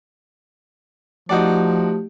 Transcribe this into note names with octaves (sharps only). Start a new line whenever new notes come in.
F3 A3 D#4 F#4 G4 D5